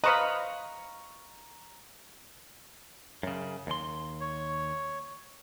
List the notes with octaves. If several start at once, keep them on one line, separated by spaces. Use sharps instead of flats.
B4 C5 D#5 F5 A#5 B5 C#6 C#7
F#2 C#3
D#2 C6
C#5